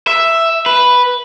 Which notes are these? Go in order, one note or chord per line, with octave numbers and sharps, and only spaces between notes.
E5
B4